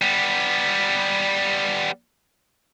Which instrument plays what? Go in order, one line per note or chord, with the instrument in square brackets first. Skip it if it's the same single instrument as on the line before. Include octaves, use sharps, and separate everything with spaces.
[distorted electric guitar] G3 B3